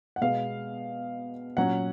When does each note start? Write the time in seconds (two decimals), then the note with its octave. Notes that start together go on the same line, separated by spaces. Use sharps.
0.16 F#5
0.21 B2 G#3 B3 F5
1.57 A#2 F#3 C#4 F#5